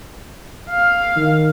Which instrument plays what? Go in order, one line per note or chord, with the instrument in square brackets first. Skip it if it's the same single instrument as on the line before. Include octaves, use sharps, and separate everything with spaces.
[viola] F5
[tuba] D#3